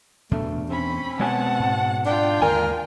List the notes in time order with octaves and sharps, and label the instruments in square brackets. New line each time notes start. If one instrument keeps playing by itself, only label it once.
[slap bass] E2 B2 D4 [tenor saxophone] A3
[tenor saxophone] C4 [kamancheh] C#4 B5
[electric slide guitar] B2 C#5 G#5 [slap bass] G#3 B3 [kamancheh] F#5 A5
[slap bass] G#2
[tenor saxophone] D4 [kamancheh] F4 G5
[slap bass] D#2 D3 G#3 [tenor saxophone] A#4 [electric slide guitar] G#5